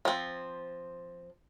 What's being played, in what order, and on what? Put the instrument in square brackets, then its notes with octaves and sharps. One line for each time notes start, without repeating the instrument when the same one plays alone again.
[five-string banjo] F3 C4